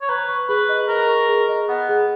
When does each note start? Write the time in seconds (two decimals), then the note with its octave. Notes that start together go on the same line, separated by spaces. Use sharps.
0.01 C#5
0.09 B4 A#5
0.29 C#6
0.48 G#4 B4
0.69 D#5
0.88 A#4 A#5
1.09 C#6
1.29 G#4
1.49 D#5
1.69 B3 F#5
1.89 G#4